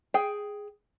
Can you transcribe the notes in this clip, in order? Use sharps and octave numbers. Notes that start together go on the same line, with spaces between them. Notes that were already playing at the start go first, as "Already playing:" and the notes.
G#4 G5